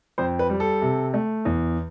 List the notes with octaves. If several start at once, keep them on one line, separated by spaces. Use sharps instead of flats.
F2 C5
B4
G3
A4
C3
A3
E2